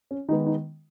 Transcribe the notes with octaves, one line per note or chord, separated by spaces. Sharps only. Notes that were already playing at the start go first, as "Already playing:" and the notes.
C#4
D#3 G#3 B3 D#4
D#4